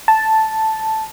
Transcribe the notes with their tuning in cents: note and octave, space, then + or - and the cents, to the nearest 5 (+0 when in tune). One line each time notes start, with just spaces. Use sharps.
A5 +0